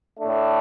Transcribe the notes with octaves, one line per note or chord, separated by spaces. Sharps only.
A2 A3 D4